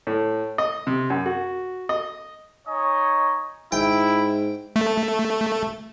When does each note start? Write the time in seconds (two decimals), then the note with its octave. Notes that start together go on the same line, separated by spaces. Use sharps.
0.07 A2
0.58 D#5
0.87 C3
1.10 F#2
1.26 F#4
1.89 D#5
2.68 D#4 C#5 D#5 G#5
3.72 G#2 E4 G5
4.76 A3